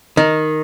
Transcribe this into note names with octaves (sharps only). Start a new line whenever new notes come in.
D#3